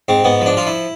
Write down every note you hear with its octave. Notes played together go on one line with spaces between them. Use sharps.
G#2 C4
G#2 B3
F3
D4
F3 F4
E4